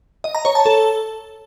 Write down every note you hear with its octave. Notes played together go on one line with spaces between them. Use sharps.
D#5
A#5
C#5
A5
A4